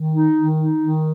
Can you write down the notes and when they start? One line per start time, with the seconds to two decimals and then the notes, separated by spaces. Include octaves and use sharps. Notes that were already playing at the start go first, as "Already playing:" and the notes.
Already playing: D#3
0.14 D#4
0.36 D#3
0.58 D#4
0.80 D#3